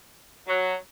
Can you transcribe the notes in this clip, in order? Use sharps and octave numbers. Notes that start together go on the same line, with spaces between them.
F#3